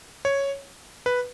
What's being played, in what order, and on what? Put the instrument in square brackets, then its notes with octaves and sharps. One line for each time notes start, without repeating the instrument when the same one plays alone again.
[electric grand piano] C#5
B4